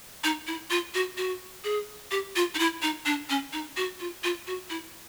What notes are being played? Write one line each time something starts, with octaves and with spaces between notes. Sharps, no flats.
D#4
E4
F4
F#4
F#4
G#4
G4
F4
D#4
E4
D#4
D4
C#4
D#4
F#4
F4
F4
F#4
E4